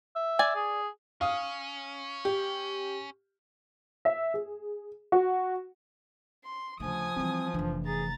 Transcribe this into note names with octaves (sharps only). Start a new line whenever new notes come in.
E5
D5 G#5
G#4
C#4 F5 D#6
G4
E5
G#4
F#4
C6
D2 C#3 F3 G#5 D#6
E3 G3 C4
F1 D3 E3
G#4 A#5 A6